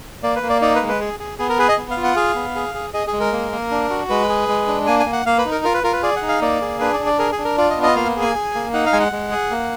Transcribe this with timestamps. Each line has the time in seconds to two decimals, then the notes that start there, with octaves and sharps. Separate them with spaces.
0.23 A#3 D5
0.36 B4
0.43 A#3
0.50 D5
0.62 D#4 D5
0.75 B4
0.82 G#3
0.88 B4
1.00 G#4
1.20 G#4
1.39 B3 G#4
1.49 A#4
1.58 G#4 B4
1.69 D#5
1.78 B3
1.91 F5
1.97 F4
2.04 F#5
2.16 G#4 F5
2.35 B3
2.55 G#4
2.75 G#4
2.94 G#4 D#5
3.07 G#4
3.13 G#3
3.20 A#4
3.32 A#3
3.52 A#3
3.71 D4
3.90 F#4
4.09 G#3 B4
4.29 G#4
4.48 G#3
4.67 D4
4.86 A#3 G#5
5.00 G#5
5.06 A#3
5.13 F#5
5.26 A#3 F5
5.38 B4
5.46 D#4
5.51 A#4
5.64 F4 A#4
5.74 B4
5.84 F4 A#4
5.93 B4
6.03 G#4 D5
6.16 F#5
6.22 D#4
6.28 F5
6.41 A#3 D5
6.61 G#4
6.80 D4 B4
6.94 D5
7.00 D4
7.06 D5
7.19 G#4 A#4
7.32 G#4
7.38 D4
7.45 A#4
7.58 F4 D5
7.70 D#5
7.77 B3
7.83 D#5
7.96 A#3 F5
8.16 G#4
8.22 G#5
8.35 G#4
8.55 A#3
8.73 D#4 F#5
8.86 F5
8.93 G#3 G#5
9.00 F#5
9.12 G#3
9.31 G#4
9.51 A#3